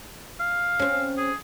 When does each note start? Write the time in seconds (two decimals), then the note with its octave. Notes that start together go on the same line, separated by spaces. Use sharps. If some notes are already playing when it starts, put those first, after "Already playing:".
0.40 F5
0.79 C4 C#4
1.18 G#4